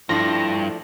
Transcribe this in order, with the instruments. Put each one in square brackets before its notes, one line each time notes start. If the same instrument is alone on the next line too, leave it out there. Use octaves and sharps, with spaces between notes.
[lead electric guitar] G2 [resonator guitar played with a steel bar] F3 A3 D4 [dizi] E4 [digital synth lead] A#6